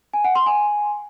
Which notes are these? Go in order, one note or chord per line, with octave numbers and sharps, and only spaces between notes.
G#5
F#5
C6
G#5